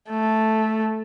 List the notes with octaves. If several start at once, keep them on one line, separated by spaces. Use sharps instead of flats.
A3